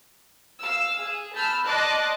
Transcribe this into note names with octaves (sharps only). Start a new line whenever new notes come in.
F5 E6
G#4
A5 B5 E6 F6 G6
D5 D#5 A5 C6 D6 F#6